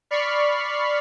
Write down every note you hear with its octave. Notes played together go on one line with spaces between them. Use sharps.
D5 B5 C#6 F6 C7